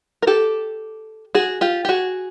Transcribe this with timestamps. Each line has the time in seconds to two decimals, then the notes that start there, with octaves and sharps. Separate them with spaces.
0.22 A#4
0.27 G4 A4
1.35 F#4 G#4
1.61 F4 G4
1.85 G4
1.89 F#4 G#4